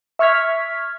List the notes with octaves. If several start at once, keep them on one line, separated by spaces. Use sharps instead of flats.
E5 C#6 F6 G#6 B6